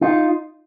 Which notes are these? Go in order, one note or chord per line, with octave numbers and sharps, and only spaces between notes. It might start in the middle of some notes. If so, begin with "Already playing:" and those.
D#4 F4